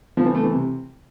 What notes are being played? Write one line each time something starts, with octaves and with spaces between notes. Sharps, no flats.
F3
E3
A3
E3
C3